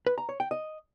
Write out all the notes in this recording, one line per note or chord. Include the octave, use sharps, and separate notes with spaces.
B4
A#5
C#5
G5
D#5